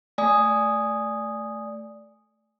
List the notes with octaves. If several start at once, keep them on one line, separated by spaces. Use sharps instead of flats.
A3 D5 G#5 D#6